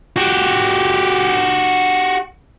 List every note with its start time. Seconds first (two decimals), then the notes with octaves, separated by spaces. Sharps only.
0.16 F#4 G4